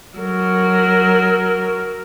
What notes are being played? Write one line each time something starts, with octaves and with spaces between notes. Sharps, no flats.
F#3 A#4